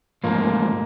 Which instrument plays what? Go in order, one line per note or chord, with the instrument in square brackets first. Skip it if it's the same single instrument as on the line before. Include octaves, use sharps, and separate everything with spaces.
[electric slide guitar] G#2 F3 A3 [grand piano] A#3